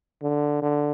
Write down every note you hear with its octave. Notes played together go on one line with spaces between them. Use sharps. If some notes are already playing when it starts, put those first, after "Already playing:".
D3
D3